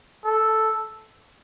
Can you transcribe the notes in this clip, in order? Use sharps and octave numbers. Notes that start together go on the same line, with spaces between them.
A4